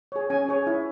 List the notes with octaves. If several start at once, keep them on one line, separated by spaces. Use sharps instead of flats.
G#4 C#5
C#4 G#5
G#4 C#5
E4